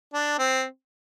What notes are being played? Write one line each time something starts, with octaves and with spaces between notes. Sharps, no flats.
D4
C4